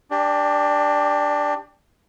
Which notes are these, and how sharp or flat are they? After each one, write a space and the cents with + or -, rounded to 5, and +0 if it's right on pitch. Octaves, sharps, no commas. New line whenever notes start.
D4 +0 G4 +25 D5 +30